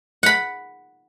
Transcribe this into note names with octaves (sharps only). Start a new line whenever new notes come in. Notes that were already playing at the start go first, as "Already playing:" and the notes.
F#5 B5